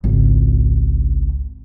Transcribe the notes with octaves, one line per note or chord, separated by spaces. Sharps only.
G#1 C#2